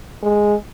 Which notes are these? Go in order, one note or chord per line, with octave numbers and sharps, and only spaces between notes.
G#3